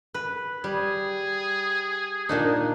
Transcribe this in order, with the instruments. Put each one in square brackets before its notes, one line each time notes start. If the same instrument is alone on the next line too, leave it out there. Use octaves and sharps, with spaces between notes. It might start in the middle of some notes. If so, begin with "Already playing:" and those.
[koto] B4
[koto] G3 [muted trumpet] G#4
[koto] A#2 D4 D#4